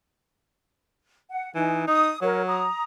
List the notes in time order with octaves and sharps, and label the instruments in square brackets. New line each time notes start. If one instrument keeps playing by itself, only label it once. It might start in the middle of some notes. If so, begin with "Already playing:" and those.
[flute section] F#5
[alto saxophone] E3 [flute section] D#4 G#5
[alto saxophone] D#4 [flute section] D#6
[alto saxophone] F#3 [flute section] A#4 C#5
[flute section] A#5 D#6